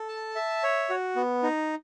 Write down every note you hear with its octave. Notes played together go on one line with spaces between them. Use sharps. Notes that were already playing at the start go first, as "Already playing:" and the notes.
Already playing: A4
A5
E5
C#5
F#4
B3
D#4